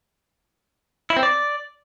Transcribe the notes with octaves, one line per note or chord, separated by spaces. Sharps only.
E4
C4
D5